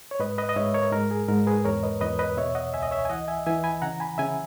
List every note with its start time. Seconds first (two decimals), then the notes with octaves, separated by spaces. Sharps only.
0.11 C#5
0.20 G#2 B4 D#5
0.38 B4 D#5
0.49 D#5
0.56 G#2 C#5 E5
0.74 A#4 C#5
0.92 G#2 A#4
1.11 G#4
1.28 G#2 A#4
1.47 G#4 B4
1.65 E2 A#4 C#5
1.83 B4 D#5
2.01 E2 B4 D#5
2.19 B4 D#5
2.37 B2 C#5 E5
2.55 D#5 F#5
2.74 C#2 E5 G#5
2.83 D#5
2.91 C#5 E5
3.05 G#5
3.10 E3 D#5 F#5
3.28 E5 G#5
3.46 E3 E5 G#5
3.64 G#5 B5
3.82 C#3 F#5 A#5
4.00 G#5 B5
4.18 C#3 E5 G#5